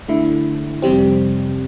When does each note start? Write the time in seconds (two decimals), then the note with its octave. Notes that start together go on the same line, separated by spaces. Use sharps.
0.08 D3 A3 E4
0.82 F2 C3 G3 C4